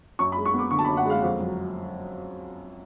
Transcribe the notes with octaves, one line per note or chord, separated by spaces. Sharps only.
F#2 C#6
B5
G#3
C#6
B3
D6
D3 C#6
A5
B5
F#2
F#5
G#3 F5
F2
F#3